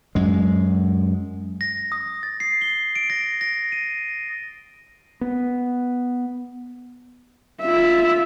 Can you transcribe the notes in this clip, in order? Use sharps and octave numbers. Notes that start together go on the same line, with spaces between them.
F#2 G#3
A#6
D#6
A6
C7
G7
D7
A#6
A#6
D#7
B3
F4 E5